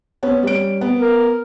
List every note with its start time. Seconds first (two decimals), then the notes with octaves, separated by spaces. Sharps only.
0.23 B3 C#4
0.43 G3 C#4 D7
0.81 B3
0.99 A#4